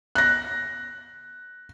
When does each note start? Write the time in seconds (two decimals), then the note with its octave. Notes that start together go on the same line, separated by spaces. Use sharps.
0.15 F#6 A#6